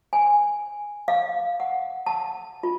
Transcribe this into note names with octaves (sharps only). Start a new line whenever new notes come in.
G#5
F5
F#5
A5
F4